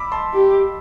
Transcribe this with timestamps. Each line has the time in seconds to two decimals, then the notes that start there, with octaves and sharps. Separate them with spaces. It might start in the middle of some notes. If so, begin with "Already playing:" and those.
Already playing: B5 D6 E6
0.12 A5 C6
0.34 G4